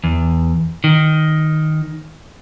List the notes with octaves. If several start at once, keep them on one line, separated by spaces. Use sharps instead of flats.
E2
D#3